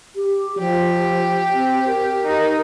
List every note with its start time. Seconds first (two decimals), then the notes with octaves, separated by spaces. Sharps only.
0.16 G4
0.59 F3 G4
1.53 C4
1.87 A#4
2.26 D#4